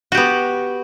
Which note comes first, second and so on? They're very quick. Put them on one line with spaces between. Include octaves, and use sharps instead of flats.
F#4 G4 B3